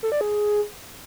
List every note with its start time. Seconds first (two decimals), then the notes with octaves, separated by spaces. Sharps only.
0.03 A4
0.12 D5
0.21 G#4